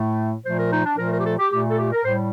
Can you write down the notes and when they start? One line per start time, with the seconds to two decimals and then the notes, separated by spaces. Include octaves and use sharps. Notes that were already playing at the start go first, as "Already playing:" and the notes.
Already playing: A2 A3
0.44 A#2 F3 A3 C5
0.58 A#4
0.71 D#4
0.85 D4
0.98 A#2 F3 A3 A#4
1.11 A#4
1.18 G4
1.24 A4
1.38 G4
1.51 A#2 A3 G4
1.70 A4
1.79 G4
1.91 A#4
2.05 A2 G3 C5